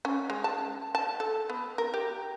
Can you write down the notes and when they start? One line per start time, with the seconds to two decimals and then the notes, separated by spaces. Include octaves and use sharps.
0.05 C#4
0.30 G#3
0.44 A5
0.95 A5
1.20 A4
1.50 B3
1.78 A#4
1.94 G4